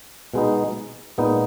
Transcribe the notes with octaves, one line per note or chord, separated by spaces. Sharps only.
B2 G#3 B3 D#4
A#2 G#3 B3 D#4